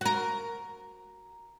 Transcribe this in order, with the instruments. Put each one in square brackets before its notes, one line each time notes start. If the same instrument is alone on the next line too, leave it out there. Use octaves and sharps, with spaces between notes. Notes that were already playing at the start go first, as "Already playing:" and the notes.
[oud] F#4 A#4